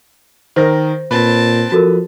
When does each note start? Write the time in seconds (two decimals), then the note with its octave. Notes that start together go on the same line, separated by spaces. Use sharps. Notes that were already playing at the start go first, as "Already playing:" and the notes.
0.56 D#3 A#4 C5 A#6
1.11 A#2 C4 B4 A5
1.72 F3 F#4 A4 A#4